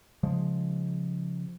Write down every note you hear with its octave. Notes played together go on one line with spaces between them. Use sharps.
C#3 F3 G#3